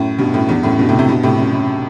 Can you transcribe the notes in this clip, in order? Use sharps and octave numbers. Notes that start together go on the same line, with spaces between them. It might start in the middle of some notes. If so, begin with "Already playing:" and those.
Already playing: F#2 A2
G2 B2
F#2 A2
E2 G2
F#2 A2
G2 B2
A2 C3
A2 C3
G2 B2
A2 C3
F#2
F#2